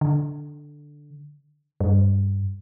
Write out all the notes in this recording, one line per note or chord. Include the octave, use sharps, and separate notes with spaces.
D3
G2